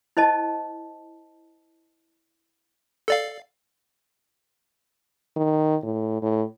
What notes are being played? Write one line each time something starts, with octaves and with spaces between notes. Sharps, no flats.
E4 C5 D#5 A5
A4 D5 F5
D#3
A2
A2